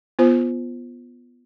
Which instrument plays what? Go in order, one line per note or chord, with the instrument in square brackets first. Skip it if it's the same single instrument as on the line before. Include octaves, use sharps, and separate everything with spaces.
[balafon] B3 F4 C5